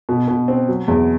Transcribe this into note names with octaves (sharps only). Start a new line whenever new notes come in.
B2
B2
C4
F#3
E2